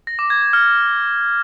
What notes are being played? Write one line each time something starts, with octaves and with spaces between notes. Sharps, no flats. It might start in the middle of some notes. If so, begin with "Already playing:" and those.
A#6
D6
G#6
G#6
F6